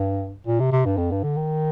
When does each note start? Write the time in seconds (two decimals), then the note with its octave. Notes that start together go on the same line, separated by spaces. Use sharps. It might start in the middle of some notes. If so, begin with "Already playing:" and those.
Already playing: G2
0.47 A#2
0.60 C3
0.72 C3
0.85 G2
0.97 F2
1.11 G2
1.23 D3
1.37 D#3